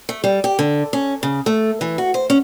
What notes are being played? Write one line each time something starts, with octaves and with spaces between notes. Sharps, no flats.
A3
G3
G4
D3
C#4
C#3
A3
E3
F#4
C5
C#4